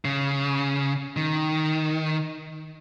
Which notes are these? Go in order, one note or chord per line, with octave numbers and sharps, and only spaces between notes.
C#3
D#3